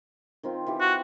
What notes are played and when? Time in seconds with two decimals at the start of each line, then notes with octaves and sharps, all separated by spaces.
0.43 D#3 C4 F4
0.67 E3 G4
0.81 F#4